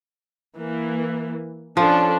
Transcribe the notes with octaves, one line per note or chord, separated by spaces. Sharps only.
E3 A#3
F3 C#4 D4 A4